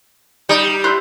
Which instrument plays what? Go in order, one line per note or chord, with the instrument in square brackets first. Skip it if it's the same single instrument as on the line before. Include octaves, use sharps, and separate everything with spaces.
[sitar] G3 [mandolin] D#4
[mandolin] E4 C5 F#6